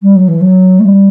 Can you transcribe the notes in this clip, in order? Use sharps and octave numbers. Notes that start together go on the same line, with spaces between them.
G3
F#3
E3
F#3
A3
G3